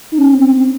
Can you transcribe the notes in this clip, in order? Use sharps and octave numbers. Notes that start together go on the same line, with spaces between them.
D#4
C#4
C4
C4